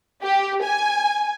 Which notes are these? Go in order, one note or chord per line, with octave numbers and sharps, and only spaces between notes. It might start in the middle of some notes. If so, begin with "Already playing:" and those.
G4
G#5